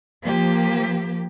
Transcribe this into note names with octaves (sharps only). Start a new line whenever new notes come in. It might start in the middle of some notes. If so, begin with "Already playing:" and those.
F3 A#3 G4